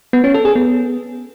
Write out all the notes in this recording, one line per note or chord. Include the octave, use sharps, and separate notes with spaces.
B3
C#4
A4
G#4
B3